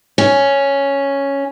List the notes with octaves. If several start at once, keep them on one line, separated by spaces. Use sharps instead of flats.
C#4